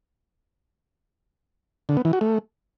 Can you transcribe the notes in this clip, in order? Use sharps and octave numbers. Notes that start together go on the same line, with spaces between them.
D3
B3
E3
F#4
A3